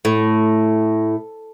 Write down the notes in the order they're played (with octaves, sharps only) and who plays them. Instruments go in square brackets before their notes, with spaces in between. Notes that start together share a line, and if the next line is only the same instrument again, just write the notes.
[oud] A2